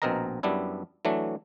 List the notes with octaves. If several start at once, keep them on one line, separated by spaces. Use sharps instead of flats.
A#1 B2 C4 A#4 D#5 A#5
F#2 G3 B3 D4 E4
E3 F#3 A3 D4